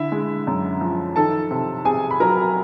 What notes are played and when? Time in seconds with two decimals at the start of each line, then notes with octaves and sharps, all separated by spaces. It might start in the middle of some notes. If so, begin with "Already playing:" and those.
Already playing: D3 E4 E5
0.12 G#3
0.47 F#2
0.81 F3
1.16 D#3 A4 A5
1.51 C3
1.85 C3 G#4 G#5
2.11 B5
2.20 F#3 A#4 A#5